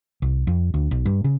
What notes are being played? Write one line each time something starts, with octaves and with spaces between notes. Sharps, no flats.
C2
F2
D2
B1
G2
C#3